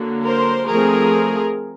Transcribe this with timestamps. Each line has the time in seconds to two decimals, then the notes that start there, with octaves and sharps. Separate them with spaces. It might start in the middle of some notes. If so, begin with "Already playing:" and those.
Already playing: D3 F#3 A#3
0.26 A#4 C5
0.68 F3 A3 C4 G#4 A#4